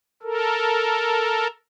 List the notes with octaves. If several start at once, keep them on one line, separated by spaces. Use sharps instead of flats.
A4 A#4